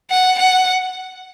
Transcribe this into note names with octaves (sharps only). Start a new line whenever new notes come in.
F#5
F#5